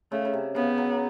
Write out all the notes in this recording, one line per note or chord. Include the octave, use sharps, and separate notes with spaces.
C#3 A3
C#3
C3
C#3 B3
F#3